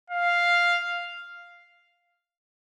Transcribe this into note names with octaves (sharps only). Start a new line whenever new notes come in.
F5